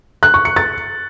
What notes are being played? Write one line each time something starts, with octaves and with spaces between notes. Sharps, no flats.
F#6
C#6
C#7
A6